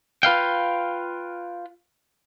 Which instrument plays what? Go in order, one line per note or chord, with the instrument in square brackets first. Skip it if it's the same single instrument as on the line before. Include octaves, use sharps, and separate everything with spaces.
[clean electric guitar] F4 B4 F5 G5